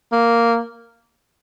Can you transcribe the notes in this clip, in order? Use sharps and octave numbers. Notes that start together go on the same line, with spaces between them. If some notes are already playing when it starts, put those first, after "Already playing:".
A#3